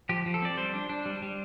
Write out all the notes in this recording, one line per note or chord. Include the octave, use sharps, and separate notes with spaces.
F3 G4
F3
A4
C4 D5
G3 C5
D4
D4
G3
G3